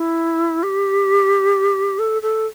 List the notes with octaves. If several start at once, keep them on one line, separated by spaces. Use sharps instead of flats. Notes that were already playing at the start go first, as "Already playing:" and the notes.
Already playing: E4
G4
A4
A4